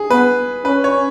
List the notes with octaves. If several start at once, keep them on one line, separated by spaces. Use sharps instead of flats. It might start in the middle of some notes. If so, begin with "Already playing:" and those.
Already playing: G#4
B3 B4
C#4 B4
C#5